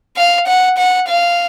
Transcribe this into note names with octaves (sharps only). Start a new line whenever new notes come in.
F5
F#5
F#5
F5